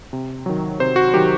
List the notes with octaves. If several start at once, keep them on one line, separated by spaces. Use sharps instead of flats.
C3
D#3 F#3
C3 C5
F#4
D#3 F#3 G4